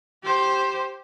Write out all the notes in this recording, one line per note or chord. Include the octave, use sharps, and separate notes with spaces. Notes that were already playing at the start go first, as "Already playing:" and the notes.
G4 C5